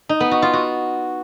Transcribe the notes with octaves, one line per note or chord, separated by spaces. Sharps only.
D#4
B3
F#4
F4
F#4